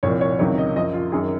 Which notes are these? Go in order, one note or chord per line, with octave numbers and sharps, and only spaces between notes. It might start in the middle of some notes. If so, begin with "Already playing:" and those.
C2 A#2 F3 C#5
C#5
C#2 C3 D#3 F#3 C#5
D#5
F#2 F3 D#5
F4
F#2 D#3 F#3 G#4